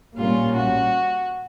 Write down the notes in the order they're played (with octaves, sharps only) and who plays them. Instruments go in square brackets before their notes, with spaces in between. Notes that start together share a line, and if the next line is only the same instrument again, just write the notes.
[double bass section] A#2 G3 A#3 C#4 [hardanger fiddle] F4
[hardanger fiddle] F#4